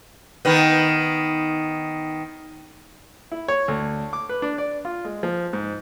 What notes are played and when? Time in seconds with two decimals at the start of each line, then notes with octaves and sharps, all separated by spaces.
0.45 D#3 B3
3.32 E4
3.48 C#5
3.68 D2
4.13 D6
4.29 B4
4.42 D4
4.58 D5
4.85 F4
5.05 G#3
5.23 F3
5.53 G#2